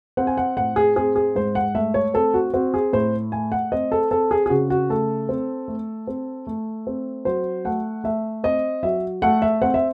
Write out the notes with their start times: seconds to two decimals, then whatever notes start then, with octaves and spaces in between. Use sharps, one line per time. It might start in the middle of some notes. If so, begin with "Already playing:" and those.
0.17 C4 F#5
0.27 G#5
0.38 F#5
0.57 A2 F#5
0.76 G#4
0.96 C4 G#4
1.16 G#4
1.35 G#2 C5
1.55 F#5
1.75 A3 E5
1.94 C#5
2.14 C4 A4
2.34 F#4
2.54 C4 F#4
2.74 G#4
2.93 A2 C5
3.32 A3 G#5
3.52 F#5
3.72 C4 D#5
3.92 A4
4.11 C4 A4
4.31 G#4
4.46 G#4
4.50 C#3 F#4
4.70 F#4
4.89 A3 A4
5.29 C4
5.68 A3
6.07 C4
6.47 A3
6.87 C4
7.25 F#3 C5
7.65 A3 F#5
8.04 A3 E5
8.44 C4 D#5
8.83 F#3 E5
9.22 A3 F#5
9.42 E5
9.62 C4 F#5
9.74 E5